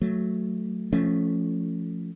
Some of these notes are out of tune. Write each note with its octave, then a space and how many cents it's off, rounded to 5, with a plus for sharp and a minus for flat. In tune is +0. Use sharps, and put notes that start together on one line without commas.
F#3 +0 A3 +0
F3 -20 A3 +0 C#4 +5